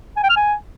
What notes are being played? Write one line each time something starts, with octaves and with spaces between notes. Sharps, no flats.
G#5
G5
F6
G#5